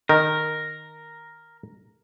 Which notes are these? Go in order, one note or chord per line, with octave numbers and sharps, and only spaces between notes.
D#3 A#4